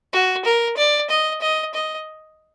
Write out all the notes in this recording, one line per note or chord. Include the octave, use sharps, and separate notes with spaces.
F#4
A#4
D5
D#5
D#5
D#5